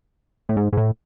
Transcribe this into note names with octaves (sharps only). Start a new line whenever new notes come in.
A2
G#2
G#2
A2